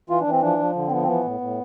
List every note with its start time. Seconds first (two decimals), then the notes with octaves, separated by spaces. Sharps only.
0.10 E3 F4
0.21 D4
0.27 E3 C4
0.42 F3 D4
0.59 F3
0.76 D3
0.87 C4
0.92 F3 B3
1.03 C4
1.08 E3 B3
1.24 A2
1.41 A2